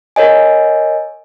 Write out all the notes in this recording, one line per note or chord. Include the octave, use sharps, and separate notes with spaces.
A#4 C#5 D#5 G#5